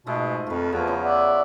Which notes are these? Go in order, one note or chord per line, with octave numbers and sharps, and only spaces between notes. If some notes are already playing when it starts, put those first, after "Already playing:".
G#2 B2 G#3 A3 F4
F2 F4 B4
E2 E3 F3 F4 C#5
C#3
D5 E5 F#5